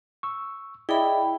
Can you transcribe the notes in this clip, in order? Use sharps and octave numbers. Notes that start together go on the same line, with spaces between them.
C#6 E6
E4 G#4 D5 D#5 G5 B5